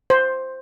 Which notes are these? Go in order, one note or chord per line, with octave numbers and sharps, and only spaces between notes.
C5